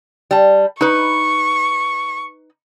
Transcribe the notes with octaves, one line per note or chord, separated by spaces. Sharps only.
G3 A5
D#4 B4 C#6